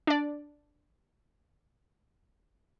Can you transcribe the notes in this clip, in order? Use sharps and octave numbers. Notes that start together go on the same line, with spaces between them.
D4 D5